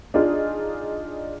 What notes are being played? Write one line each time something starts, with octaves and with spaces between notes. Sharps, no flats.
D4 D#4 F4 G#4